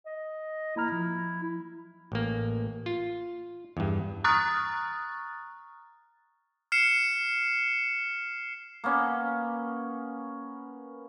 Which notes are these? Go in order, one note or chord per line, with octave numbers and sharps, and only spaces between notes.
D#5
A#3 E4 A#5 F6
F3
E4
A1 A#3
F4
E2 G2
A#5 C#6 D#6 F6 F#6 A6
F6 C7 C#7 E7
A#3 B3 C#4